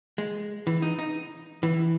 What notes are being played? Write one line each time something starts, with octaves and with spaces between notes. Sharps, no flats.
G#3
E3
D#4
D#4
E3